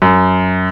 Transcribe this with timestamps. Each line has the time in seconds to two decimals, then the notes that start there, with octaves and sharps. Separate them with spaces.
0.02 F#2